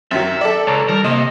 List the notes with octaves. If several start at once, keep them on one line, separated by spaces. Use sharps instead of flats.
F#2 D#3 F#3 E5
A4 D5
C#2 C#5 A5 A#5
D#3 G3 A#4 A5
C3 A#3 D#5